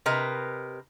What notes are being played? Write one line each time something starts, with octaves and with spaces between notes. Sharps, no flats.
C3 A#4 B4 D#5